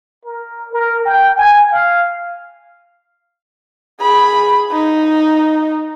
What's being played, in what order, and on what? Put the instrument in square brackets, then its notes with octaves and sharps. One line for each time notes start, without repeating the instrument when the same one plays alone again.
[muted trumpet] A#4
A#4
G5
G#5
F5
[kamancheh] G#4 B5
D#4